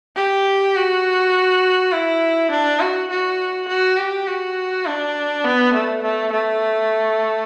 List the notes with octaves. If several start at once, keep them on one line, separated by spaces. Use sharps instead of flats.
G4
F#4
E4
D4
F#4
F#4
F#4
G4
F#4
D4
B3
A3
A3
A3